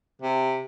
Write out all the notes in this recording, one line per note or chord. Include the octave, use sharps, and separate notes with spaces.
C3